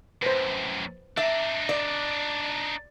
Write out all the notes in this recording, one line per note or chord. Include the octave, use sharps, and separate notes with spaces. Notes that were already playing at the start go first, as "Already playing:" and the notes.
F#2 A2 B4 C5
D4 D#4 E5
D5